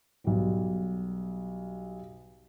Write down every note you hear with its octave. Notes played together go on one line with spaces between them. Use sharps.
B1 G3